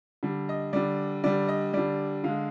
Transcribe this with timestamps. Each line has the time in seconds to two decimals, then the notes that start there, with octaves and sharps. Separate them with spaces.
0.23 D3 G3
0.49 D#5
0.73 D3 G3 D5
1.24 D3 G3 D5
1.48 D#5
1.73 D3 G3 D5
2.24 D3 G#3 F5